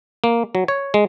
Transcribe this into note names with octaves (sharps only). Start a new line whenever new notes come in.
A#3
F#3
C#5
G#3